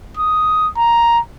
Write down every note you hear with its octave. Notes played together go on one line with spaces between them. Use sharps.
D#6
A#5